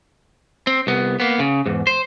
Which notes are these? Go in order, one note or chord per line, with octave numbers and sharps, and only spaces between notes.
C4
C2 B3
A#3 B3
C#3
E2 G#2
C5